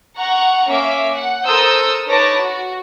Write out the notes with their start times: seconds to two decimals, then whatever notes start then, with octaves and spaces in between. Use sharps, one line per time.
0.16 F#5 A#5 C#6
0.68 A#3 C#4 E5 D6
1.14 F#5
1.45 A4 A#4 C5 D#6 E6 G6
2.07 D#4 B4 C#5 A5 D6 A#6
2.40 F#4